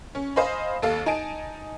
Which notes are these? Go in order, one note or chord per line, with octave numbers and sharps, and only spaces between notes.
C#4
C5 D#5 F5 G#5 B5
D#2 A4 F5
D#4 G#5 A5 D7